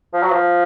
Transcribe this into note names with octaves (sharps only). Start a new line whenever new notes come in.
F3
F#3
F3